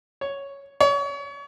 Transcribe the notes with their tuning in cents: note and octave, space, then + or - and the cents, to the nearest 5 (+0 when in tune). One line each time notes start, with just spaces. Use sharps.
C#5 +5
C#5 +35